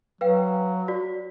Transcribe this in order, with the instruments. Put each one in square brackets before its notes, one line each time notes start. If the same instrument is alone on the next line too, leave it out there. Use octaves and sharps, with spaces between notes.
[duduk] F#3 [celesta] B4 F5 G5
[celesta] F#4 D5